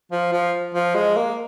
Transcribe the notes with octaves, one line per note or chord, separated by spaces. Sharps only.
F3
F3
F3
G#3
A#3